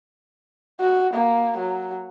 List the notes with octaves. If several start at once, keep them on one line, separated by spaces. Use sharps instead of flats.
F#4
A#3
F#3